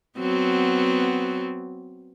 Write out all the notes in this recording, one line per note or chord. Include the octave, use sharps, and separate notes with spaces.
F#3 B3 C4